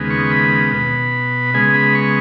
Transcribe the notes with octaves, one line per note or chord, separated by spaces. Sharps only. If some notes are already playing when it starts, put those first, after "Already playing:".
Already playing: D#2 C#3 G#3 B3
C#6
B5
B2 B3
C#3 G#3 B3 G#5
B5
C#6